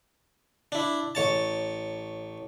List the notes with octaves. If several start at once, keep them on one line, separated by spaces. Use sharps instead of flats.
D4 E4
A1 C#5 A5